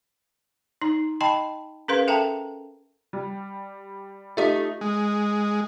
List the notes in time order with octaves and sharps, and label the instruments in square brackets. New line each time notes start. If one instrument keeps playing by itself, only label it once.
[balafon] D#4 A#5
D#5 G5 A5 B5 C6
C#4 G#4 A#4 B4 F5 C6
A4 E5 G5 A5 A#5
[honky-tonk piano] G3
[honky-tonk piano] A3 D#4 [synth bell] F4 G4 E5
[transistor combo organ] G#3